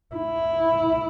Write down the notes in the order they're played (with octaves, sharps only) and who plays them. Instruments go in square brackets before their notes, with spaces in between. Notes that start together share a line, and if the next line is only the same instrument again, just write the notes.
[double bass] E4